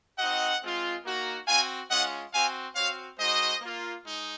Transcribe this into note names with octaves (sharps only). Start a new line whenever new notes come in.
C4 D#4 F#4 D#5 F#5
G#3 C4 F4
A#3 D#4 F#4
C4 F#4 F5 G#5
G#3 C#4 F4 D#5 F#5
C4 F#4 F5 G#5
C4 F#4 C#5 F5
G#3 D#4 F#4 C5 D#5
A#3 F4
G#3 D#4